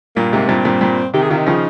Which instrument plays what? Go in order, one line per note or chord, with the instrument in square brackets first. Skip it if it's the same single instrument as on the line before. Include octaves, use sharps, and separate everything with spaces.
[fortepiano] G2 A#2 [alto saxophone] A#3
[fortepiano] G#2 C3
[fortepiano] G2 A#2 [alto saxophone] C4
[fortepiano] G2 A#2
G2 A#2
[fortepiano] C3 D#3 [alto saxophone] G4
[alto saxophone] G#4
[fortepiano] C3 D#3 [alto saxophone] F4
[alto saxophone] D#4
[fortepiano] C#3 F3